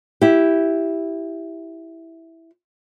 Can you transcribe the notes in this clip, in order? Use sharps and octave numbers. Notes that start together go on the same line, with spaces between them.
E4 G4